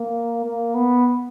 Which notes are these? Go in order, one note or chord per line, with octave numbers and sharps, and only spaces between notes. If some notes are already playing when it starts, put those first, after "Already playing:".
Already playing: A#3
A#3
B3